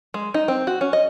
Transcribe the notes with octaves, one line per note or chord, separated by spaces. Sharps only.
G#3
D#4
C4
F#4
C#4
D#5